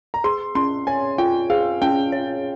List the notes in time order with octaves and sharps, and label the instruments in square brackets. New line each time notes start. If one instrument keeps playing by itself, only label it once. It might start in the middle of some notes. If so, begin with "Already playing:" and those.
[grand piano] A#5
[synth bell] G#4 [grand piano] C6
[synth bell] C#4 [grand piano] C6
[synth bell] C#5 [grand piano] G#5
[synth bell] F4 [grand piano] G5
[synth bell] G#4 [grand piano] F5
[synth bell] C#4 [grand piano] G5
[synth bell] C#5